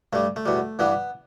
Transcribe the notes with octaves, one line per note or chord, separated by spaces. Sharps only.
G2 G3 A3
A3
E2 B2 G3
G2 E3 G3 B3